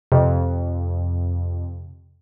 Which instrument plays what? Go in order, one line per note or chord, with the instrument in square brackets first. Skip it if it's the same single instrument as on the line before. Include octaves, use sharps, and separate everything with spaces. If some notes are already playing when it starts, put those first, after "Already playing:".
[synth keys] F2 [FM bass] C3